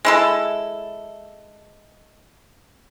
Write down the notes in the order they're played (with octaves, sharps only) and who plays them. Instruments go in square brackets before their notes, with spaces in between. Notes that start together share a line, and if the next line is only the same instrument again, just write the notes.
[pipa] G#3 E4 A4